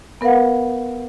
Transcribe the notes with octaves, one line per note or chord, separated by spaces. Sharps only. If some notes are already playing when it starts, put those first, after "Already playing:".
B3 A#4 B4 F5 F#5